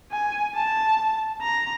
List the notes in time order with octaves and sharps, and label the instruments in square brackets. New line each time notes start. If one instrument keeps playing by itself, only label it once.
[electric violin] G#5
A5
A#5